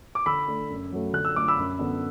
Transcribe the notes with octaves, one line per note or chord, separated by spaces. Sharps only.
D6
D3 B5 E6
A3 D4
F#2
F#3 A3
D3 F#6
E6
A3 D4 D6
B5 E6
F#2
D3 B3 D4